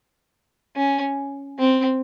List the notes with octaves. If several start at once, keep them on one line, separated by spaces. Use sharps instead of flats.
C#4
C4